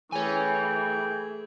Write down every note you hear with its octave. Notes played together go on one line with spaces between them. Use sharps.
E3 A3 G#4 C#5 G5 G#5